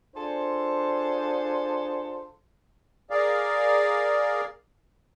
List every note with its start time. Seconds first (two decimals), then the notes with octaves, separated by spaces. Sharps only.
0.15 D4 F4 G#4 A4 C5
3.10 G#4 A#4 D5 F5